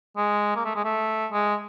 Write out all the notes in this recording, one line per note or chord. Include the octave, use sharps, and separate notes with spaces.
G#3
A#3
A3
G#3
A3
G#3